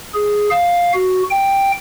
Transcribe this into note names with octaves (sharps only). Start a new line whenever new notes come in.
G#4
F5
F#4
G5